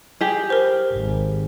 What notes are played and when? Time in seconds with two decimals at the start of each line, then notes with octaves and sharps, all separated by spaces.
0.21 G4 G#4
0.50 A#4 C5
0.92 G#1